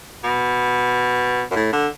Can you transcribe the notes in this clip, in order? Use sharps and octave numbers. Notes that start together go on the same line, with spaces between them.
B2
F#2
A2
D3